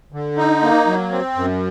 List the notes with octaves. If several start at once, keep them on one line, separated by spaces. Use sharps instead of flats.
D3
D#4
A#3
F#3
C4
F#2